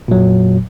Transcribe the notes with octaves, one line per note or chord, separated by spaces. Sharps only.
F2 A#2 F#3